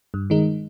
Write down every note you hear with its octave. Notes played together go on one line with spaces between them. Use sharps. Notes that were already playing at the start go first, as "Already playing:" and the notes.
G2
D#3 G#3 D#4